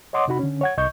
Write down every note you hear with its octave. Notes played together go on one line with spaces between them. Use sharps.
C#5 D#5 F#5 C6 D6 D#6
C3 D#4 F#4 B5
D3 C#4
C#5 F#5 G#6
C2 D#5 C#6 G6